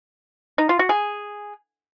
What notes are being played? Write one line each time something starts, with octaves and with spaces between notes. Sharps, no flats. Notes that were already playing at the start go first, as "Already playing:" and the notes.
D#4
F4
F#4
G#4